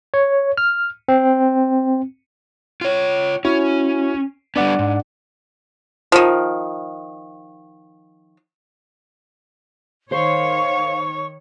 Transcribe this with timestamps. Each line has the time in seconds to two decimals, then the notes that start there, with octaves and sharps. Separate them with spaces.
0.14 C#5
0.57 F6
1.08 C4
2.81 F4 C#5
3.45 C#4 E4 F#4 C#5
4.56 G3 B3 D4 D5 F#5
4.79 G#2
6.12 D#3 F3
10.12 D#3 C5 C#5 F5 C#6